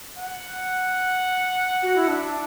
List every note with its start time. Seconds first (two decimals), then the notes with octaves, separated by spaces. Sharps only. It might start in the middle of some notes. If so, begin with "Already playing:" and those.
0.17 F#5
1.82 F#4
1.95 E4
2.07 D4 E5